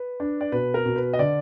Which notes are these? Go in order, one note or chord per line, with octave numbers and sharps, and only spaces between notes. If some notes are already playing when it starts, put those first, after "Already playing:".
Already playing: B4
D4
D5
B2 B4
A#4
B2
B4
D#5
D3 D5